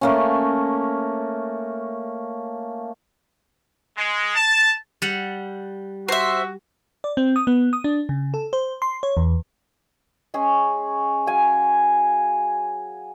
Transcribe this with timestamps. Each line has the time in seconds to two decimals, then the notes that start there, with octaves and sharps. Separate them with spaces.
0.01 A3 A#3 C#4
3.97 G#3
4.35 A5
5.02 G3 F#5
6.09 F#4 C5 E5
7.04 D5
7.17 C4
7.36 D#6
7.47 B3
7.73 D#6
7.84 D4
8.09 C#3
8.34 A4
8.53 C5
8.82 C6
9.03 C#5
9.17 E2
10.34 G#3 C#4 G#4
11.26 F#3 F5 G#5